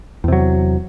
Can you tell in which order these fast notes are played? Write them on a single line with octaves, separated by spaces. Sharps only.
E2 C3 F#3